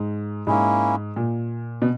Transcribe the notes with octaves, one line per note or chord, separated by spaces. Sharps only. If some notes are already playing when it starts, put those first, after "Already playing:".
Already playing: G#2
G#2 A#3 C#4 E4
A#2
B2